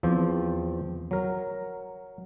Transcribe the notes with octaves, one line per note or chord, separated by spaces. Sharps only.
E2 F3 C4 G5
F#3 A#4